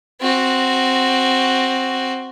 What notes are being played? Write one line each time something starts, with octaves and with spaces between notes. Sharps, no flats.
C4 F#4